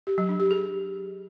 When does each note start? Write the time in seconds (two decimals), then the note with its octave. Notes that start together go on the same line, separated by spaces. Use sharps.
0.07 G4
0.18 F#3
0.29 D4
0.40 G4
0.51 G#4